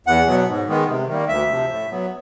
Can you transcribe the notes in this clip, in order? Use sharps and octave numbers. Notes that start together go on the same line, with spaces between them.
E2 F#5
B2 F#3 B3
G#2
D#3 G#3 B3
C3
D#3 G3 A#3
D2 E5
C3 F3
A2
F#3 B3